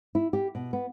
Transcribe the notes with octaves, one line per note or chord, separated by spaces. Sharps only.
E4
G4
B2
B3